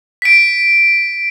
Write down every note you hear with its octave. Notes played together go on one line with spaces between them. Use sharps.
B6 D7